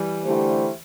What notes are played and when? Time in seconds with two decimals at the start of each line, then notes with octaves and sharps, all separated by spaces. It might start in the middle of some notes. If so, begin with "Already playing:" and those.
Already playing: E3 G3
0.24 D3 A3 E4 G4 C5